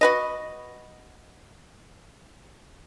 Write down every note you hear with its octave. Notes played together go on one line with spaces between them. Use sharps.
F#4 B4 D#5